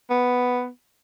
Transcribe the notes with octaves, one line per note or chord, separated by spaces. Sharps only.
B3